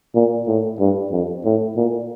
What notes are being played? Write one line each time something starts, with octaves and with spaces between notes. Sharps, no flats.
A#2
A2
G2
F2
A2
A#2